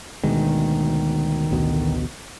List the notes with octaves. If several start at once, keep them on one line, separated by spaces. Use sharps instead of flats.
D2 B2 D#3 G#3
A1 D2 B2